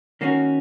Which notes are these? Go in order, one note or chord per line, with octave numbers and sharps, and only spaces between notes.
D#3 A#3 C#4 F#4